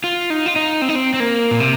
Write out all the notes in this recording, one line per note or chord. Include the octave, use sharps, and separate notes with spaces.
F4
D#4
F4
D#4
C4
D#4
C4
C4
A#3
A#2
C3